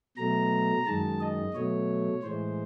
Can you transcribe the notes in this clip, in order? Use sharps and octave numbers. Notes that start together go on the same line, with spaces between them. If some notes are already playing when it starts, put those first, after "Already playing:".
B2 F#3 A3 A#5
F#2 D#3 G#3 A5
D#5
B2 F#3 A3 C#5
A2 E3 G#3 C5